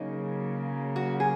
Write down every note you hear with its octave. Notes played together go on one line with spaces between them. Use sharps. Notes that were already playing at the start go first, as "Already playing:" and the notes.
Already playing: C#3 F#3 A#3 D#4
F#4
G#4